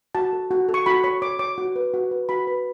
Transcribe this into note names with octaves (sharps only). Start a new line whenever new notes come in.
F#4 A5
A4
F#4
A4
C#6
F#4 B5
C#5 C#6
C#5 D6
C#5 D6
F#4
B4
F#4
B4
F#4 B5
B4